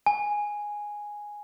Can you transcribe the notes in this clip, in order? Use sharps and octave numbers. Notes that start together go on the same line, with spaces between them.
G#5